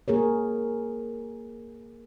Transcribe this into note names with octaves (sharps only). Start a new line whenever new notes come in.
A#3 G#4 A#4 C#5